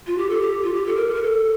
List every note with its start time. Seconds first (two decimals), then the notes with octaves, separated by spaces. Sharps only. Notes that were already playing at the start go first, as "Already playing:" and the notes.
0.07 F4
0.18 G4
0.30 A4
0.41 G4
0.64 F4
0.73 G4
0.86 A4
0.96 A#4
1.08 A4
1.14 A#4
1.23 A4